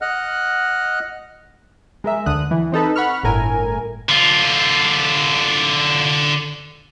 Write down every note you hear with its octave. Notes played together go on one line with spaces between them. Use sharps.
D#5 F#5 F6 F#6
G#3 A#4 E5
D2 D3 D#6 F#6
E3
C4 D#4 A4 B4
F#5 B5 C#6 F6
G1 A2 A#4 G#5
D3 F4